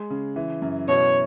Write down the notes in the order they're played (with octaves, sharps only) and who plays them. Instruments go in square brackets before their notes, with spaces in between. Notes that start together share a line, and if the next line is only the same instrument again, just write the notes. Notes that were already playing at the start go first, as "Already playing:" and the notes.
Already playing: [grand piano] G#3
C#3
E3
F#2
[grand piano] B2 [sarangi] C#5